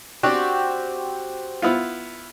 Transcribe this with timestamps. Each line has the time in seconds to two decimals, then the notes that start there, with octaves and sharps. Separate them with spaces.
0.23 C4 D4 F#4 G4
1.62 B3 E4 F4